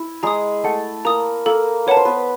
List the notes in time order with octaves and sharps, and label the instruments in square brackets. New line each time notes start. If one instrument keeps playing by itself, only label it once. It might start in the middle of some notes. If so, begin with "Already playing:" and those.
Already playing: [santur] E4
[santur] G#3 G#4 [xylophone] A#5 D#6
[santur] A3 A4 [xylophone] F#5
[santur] A#3 A#4 [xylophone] A#5 D#6
[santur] A#3 A#4 [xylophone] A4
[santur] B4 [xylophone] C#5 F#5 A5
[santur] C5
B3 B4